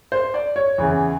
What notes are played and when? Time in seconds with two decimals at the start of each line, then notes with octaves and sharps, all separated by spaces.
0.12 C5
0.34 D5
0.56 C#5
0.78 E2 C#3 E3